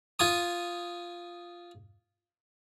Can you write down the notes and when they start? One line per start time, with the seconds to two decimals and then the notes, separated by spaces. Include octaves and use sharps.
0.19 F4 G#5 D#6